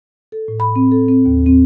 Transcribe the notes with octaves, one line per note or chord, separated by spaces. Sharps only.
A4
A2
B5
C4
A4
C4
D#2
C4